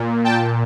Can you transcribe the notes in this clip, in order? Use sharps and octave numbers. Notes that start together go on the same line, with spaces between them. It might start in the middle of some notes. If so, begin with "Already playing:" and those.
Already playing: A#2
G5 A5